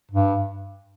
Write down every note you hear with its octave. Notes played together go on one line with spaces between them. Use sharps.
G2